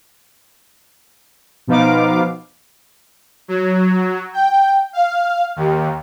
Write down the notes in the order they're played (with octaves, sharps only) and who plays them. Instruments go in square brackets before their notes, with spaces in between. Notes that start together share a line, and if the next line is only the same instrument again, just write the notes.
[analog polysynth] B2 F3 B3 D#4 F5 D6
[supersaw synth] F#3
G5
F5
D#2